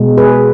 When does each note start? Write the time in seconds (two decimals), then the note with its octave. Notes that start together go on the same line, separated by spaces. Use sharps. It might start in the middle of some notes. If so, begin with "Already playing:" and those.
Already playing: B2 G#3
0.17 G#4 B4